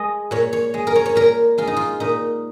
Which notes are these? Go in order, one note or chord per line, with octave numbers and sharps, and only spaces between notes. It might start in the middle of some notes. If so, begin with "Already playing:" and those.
Already playing: G#3 D#5
A#2 C#5
C#5
G#3
A#4
C#5
C#5
A#2 A#4
G#3 F4
D#4
F4
A#2 D#4